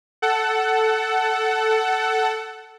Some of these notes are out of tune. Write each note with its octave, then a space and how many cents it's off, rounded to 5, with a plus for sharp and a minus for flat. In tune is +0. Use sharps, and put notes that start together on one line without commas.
A4 +0 F#5 +20